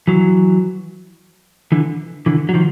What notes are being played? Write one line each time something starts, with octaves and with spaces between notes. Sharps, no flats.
E3 F#3
D3 E3
D3 E3
F#3
D#3 F3